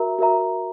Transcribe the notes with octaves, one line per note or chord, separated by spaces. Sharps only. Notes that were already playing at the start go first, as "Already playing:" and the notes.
Already playing: F#4 A#4 E5 A#5
F#4 A#4 E5 A#5